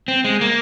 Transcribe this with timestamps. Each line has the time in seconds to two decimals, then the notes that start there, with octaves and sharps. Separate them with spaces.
0.08 C4
0.24 G#3
0.41 A#3